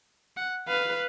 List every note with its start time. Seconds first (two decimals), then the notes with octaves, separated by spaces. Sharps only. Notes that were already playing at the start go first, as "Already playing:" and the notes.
0.37 F#5
0.68 B4 F5